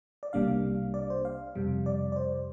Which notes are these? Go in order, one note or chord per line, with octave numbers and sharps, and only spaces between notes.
D5
C2 C3 G3 A#3 D4 F5
D5
C5
F5
F2 C3 G3
D5
D5
C5